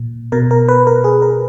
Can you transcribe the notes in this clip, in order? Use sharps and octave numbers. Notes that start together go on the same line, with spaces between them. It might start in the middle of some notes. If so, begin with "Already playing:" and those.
Already playing: A#2
B2 A#4
A#4
B4
A#4
G#4
A#4